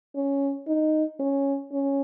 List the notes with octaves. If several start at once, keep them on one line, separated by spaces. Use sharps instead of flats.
C#4
D#4
C#4
C#4